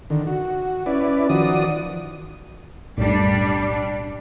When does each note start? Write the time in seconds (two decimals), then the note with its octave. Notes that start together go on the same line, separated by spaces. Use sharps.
0.10 D3 D#3
0.27 F#4
0.86 C#4 E4 B4 D5
1.29 D#3 F3 F#4 D5 D#6
2.98 B1 F#2 A2 G3 D4